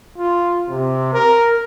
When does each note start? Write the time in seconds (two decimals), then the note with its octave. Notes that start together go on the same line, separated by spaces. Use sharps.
0.18 F4
0.69 C3
1.13 A#4